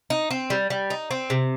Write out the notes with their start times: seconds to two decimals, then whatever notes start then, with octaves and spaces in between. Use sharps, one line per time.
0.10 D#4
0.31 C4
0.50 G3
0.70 G3
0.90 D#4
1.11 C4
1.30 C3